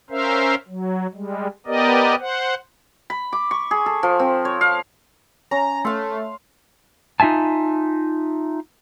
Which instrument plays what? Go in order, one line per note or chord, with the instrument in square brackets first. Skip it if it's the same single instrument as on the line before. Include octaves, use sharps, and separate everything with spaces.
[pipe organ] C#4 A#4 C5 E5 F5
F#3
G3 G#3
B3 G4 A#4 D5 D#5
C5 F#5
[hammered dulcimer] B5
D6
C#6
G#4
A4
F3
C4
C#5
F5
[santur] C#4 [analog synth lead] A#5
[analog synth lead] A3 [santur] F5 C6
[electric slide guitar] D#4 F4 E5 G#5 A5